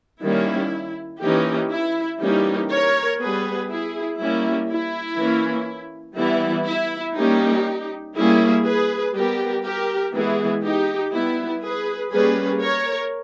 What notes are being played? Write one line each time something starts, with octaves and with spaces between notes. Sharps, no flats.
D#3 G3 A#3 C#4 E4
E3 A#3 C#4 D#4 G4
E4
E3 G3 A#3 C#4 D#4 G4
A#4 C#5
G3 B3 G#4 B4
E4 G#4
G3 A#3 C#4 E4
E4
E3 A#3 C#4
E3 G3 B3 E4
E4
G3 A#3 C#4 D#4 G4
G3 A#3 C#4 E4 G#4
G#4 B4
G3 B3 G4 A#4
G4 A#4
E3 G#3 B3 E4 G#4
D#4 G4
G3 B3 E4
G#4 B4
G3 A#3 C#4 G#4 B4
A#4 C#5